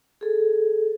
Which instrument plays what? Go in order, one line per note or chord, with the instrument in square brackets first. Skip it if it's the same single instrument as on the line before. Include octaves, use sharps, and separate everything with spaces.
[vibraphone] G#4 A4